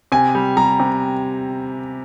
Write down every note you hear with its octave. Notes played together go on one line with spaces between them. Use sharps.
C3 G#5
G3
G3 A#5
C3